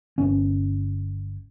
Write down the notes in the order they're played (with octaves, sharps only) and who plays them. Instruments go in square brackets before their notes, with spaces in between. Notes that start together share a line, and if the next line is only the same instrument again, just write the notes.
[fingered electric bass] G1 C#4